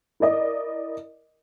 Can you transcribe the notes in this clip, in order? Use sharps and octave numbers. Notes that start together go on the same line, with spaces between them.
E4 A#4 D5 D#5